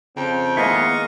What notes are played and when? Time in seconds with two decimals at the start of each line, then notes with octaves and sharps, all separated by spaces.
0.17 F2 C#3 C4 G5
0.57 D#3 G#3 A#3 B3 E4 D#5 F5 C#6